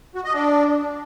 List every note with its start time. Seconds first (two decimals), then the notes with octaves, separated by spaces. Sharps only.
0.15 F#4
0.24 D#5
0.34 D4